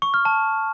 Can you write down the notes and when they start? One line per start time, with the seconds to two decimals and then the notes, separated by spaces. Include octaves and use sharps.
0.02 C#6
0.14 F6
0.25 A5